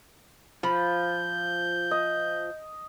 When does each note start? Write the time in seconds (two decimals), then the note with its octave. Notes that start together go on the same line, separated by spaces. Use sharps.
0.63 F3 B5 G6
1.91 D#5